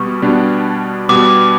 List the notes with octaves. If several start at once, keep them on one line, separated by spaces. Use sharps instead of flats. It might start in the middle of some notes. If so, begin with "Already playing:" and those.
Already playing: B2 G3 B3 C#6
B2 G3 B3 D4
B2 G3 B3 D6